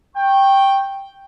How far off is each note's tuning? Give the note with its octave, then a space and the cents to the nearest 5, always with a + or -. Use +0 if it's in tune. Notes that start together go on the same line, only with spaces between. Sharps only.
G5 +0 C#6 -20